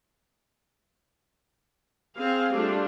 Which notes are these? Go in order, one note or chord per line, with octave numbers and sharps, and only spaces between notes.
C4 G#4 F5
G3 A3 D4 F4